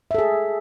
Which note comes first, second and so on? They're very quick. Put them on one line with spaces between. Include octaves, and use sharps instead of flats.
E5 A4 G#4